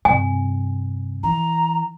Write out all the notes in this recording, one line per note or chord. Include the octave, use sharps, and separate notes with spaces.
G2 C3 G#5
E3 A#5